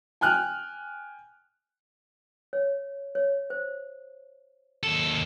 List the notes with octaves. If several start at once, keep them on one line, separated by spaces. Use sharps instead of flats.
G5 G#5 F6 F#6
C#5
C#5
C5
D#2 A4